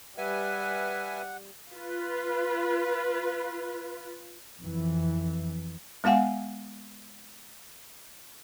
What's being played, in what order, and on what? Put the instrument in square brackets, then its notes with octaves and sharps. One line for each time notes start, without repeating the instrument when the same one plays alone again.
[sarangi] G3 [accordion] B4 E5 G#5 [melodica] F#5
[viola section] F4 B4
[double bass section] F2 E3
[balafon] G#3 B3 F5 F#5 G#5